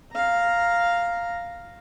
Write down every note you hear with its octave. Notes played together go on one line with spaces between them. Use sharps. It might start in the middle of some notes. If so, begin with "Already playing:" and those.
F5 A#5